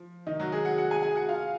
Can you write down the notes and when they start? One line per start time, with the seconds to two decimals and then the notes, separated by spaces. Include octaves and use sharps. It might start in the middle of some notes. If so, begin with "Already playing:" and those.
Already playing: F3
0.27 D#3 D#4
0.39 F#3 F#4
0.52 G#3 G#4
0.65 F#4 F#5
0.78 F#4 F#5
0.90 G#4 G#5
1.03 G#4 G#5
1.15 F#4 F#5
1.29 F4 F5